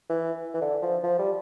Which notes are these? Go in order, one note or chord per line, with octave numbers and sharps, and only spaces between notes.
E3
E3
D3
F3
F3
G3